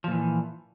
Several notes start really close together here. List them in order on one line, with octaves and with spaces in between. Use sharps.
F3 A#2 E3